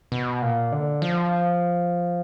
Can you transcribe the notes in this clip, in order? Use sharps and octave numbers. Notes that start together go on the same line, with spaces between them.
B2
A#2
D3
F3